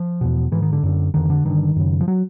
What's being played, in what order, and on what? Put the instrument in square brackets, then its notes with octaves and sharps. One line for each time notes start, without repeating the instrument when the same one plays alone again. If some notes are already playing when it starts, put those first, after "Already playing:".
Already playing: [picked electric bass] F3
E2 B2
G#2 E3
D#3
D3
F#2 D3
F2 D3 D#3
D3
G2 D3 D#3
F#2 C#3
F3
F#3